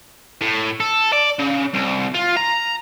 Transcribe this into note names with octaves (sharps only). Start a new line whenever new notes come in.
A2
A4
D5
C#3
C2
F4
A#5